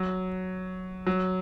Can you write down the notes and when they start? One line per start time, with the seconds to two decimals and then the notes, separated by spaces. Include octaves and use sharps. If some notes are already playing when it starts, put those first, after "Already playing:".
Already playing: F#3
1.07 F#3